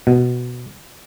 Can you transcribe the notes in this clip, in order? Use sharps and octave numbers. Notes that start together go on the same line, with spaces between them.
B2